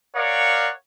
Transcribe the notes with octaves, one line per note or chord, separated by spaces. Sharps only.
A#4 C#5 D5 F5 F#5